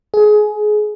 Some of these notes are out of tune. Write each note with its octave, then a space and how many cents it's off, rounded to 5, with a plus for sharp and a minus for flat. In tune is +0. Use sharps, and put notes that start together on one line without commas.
G#4 +20